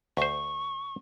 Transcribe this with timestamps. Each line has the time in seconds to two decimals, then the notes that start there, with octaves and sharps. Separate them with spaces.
0.17 D2 C5 C#6